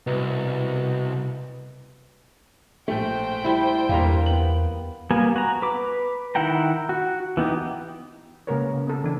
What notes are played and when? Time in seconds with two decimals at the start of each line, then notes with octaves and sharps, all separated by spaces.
0.07 C2 B2
2.88 A#1 A3 C5 G5
3.44 G3 E4
3.89 G1 E2 G3 A#3 A#4 A#5
4.26 B3 F#7
5.11 G3 A#3 B3 A#4 G#5
5.36 F#4 A#5
5.62 B4 D6
6.35 D#3 E4 F#5 G5 A#5
6.89 F#4
7.37 E3 B3 D#4 G4
8.47 C#3 G#3 A#3 A#4 B4 C#5
8.74 C#3
8.87 B3 A4
9.02 D3 E3 D4